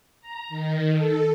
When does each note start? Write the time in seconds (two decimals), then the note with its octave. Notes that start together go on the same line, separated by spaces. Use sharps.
0.20 A#5
0.49 D#3
0.93 A4